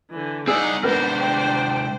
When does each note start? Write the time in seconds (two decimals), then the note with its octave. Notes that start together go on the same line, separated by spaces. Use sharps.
0.10 D3 E3
0.48 C4 D#4 G#4 D5 F#5 E6
0.83 C3 G#3 B3 D4 A#4 C5
1.20 G5